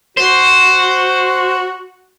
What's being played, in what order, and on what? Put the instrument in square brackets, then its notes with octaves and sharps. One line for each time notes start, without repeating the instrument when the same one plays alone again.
[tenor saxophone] F#4 [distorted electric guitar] C5